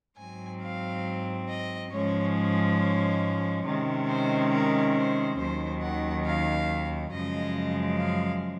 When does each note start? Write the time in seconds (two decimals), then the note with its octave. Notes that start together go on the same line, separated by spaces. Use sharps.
0.17 G#2 F#3 C4 G#5
0.61 F5
1.49 D#5
1.92 G#2 F3 G#3 C#4 C#5
2.79 C#5
3.65 C3 D#3 G#3 C#4
4.08 C5
4.51 A#4
4.96 C5
5.38 D#2 D#3 F#3 C#4 C5
5.82 F#5
6.26 F5
7.12 F#2 C#3 F3 G#3 D#5
7.98 F5